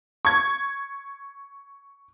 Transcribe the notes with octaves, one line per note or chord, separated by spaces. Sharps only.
C#6 G#6